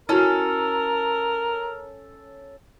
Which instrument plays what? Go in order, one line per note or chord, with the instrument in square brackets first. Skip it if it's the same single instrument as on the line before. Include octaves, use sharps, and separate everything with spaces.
[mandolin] C#4 A4 [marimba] E4 F#4 [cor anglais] A#4